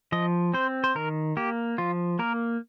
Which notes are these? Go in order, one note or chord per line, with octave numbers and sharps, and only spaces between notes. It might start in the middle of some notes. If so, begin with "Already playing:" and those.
F3 D#5
C4 C5
C5
D#3 A#4
A#3 G4
F3 F4
A#3 A#4